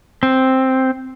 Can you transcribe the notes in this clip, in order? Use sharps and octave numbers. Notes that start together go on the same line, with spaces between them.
C4